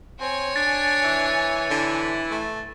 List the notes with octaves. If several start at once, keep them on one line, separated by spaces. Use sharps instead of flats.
C4 C#5 G#5
D4 A6
E3
D3 E3 E4
A3